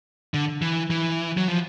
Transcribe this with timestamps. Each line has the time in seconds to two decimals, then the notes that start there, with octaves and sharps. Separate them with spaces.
0.34 D3
0.62 E3
0.90 E3
1.37 F#3
1.48 F3